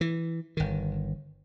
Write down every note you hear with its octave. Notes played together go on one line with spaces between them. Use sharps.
E3
G1 D#3